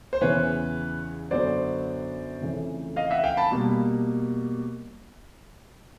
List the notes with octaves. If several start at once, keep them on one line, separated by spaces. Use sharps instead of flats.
C5
E2 C#3 E3 B4 C#5
F#2 D3 F#3 B3 C5 D5
F2 C#3 E3 A3
D#5 F5
E5 F#5
F5 G5
A5 B5
B2 G3 A#3